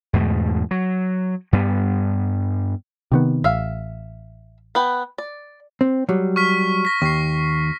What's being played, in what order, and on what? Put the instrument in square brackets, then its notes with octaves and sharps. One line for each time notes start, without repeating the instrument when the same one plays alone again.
[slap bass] E2 G#2 B2 A3
F#3
G2 G3 B3
[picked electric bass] C3 D#3 B3
[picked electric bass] A1 [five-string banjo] E5 F5
[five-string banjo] B3 B4 G5
D5
[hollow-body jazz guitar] C4
F#3 G3
[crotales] C#6 F6 B6
A#6 B6
[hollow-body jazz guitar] D#2 [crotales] C#6 C7